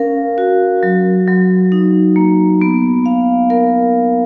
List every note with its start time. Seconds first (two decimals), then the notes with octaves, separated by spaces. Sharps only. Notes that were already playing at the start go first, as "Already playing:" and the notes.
Already playing: C#4 A#4 F5
0.38 F#4
0.83 F#3
1.27 F#3
1.72 D#4
2.16 A#3
2.62 B3
3.06 F5
3.50 A#4